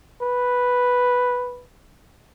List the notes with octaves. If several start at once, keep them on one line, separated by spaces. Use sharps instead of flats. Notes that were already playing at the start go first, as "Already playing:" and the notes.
B4